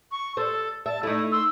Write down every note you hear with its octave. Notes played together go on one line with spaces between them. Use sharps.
C#6
A4 C5
E5 A5
A3 D#4 E4
C6 E6